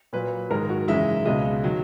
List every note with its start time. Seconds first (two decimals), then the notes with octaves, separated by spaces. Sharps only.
0.13 A#2 F#3 B4
0.50 G#2 D#3 G#3 A#4
0.69 F#4
0.88 F#2 C#3 E3 G#3 E5
1.25 C#2 B2 G#3 D#5
1.64 D#3 F#3